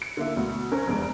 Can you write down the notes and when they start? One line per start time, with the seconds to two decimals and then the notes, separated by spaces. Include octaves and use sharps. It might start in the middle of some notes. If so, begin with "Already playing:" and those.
0.02 C#7
0.17 D3 A#3 E4
0.36 D2 B2
0.72 C4 C#4 A#4
0.87 F1 E2 G#3 D4 D7